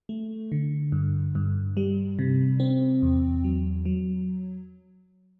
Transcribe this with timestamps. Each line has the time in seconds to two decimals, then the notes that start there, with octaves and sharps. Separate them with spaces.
0.09 A3
0.52 D3
0.92 G2
1.35 G2
1.77 G3
2.19 C3
2.60 C4
3.02 E2
3.44 F#3
3.85 F#3